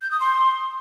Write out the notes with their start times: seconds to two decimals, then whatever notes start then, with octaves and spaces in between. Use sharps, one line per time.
0.02 G6
0.11 D#6
0.20 C6